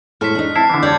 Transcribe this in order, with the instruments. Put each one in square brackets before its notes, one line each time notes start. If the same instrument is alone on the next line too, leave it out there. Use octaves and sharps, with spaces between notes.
[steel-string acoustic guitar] A2 A4 C5 [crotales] F6 B6
[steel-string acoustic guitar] D4 D#4
[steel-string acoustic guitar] C4 [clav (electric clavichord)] E4 [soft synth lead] A5 [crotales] C7
[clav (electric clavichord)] D3 E3
[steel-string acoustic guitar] G3 C#5 D5 [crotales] G6 G#6